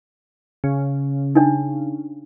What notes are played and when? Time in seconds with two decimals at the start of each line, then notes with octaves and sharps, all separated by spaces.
0.64 C#3
1.35 D4 D#4